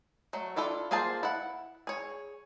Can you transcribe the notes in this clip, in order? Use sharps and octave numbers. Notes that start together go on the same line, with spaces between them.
F#3 A3
D4 E4 F4 A4
A#3 F4 G#4 C5 A5
E4 F#5
G#4 C#5